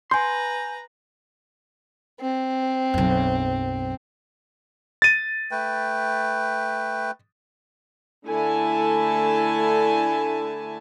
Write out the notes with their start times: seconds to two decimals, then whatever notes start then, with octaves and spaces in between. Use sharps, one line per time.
0.11 B4 G#5 A#5 C6 G6
2.20 C4
2.94 B1 F#2
5.02 A6 D#7
5.51 A3 B4 G5
8.25 D3 A3 E4 A4 G#5 A5